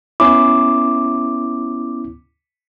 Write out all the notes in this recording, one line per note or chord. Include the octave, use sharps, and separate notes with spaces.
B3 C#4 E4 D6